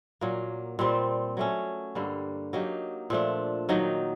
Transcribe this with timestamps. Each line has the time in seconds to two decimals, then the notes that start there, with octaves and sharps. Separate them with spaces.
0.21 A#2 F#3 A#3
0.79 A#2 G3 C4
1.37 F#3 A3 C#4
1.95 G2 D3 G3 A#3
2.53 F#3 A#3 D#4 G4
3.10 A#2 F3 A3 D4
3.69 D#3 F#3 A#3 D#4